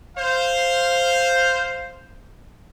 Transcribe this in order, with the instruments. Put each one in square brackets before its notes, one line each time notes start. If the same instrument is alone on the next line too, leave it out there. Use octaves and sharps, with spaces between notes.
[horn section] C5 F5